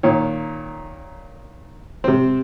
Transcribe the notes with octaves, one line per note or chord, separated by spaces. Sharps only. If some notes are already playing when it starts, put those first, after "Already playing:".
A#2 D#3 C#5
C3 C4